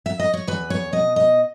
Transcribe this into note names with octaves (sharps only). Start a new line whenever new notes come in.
E5
D#5
C#5
E2 B4
C#5
B2 D#5
D#5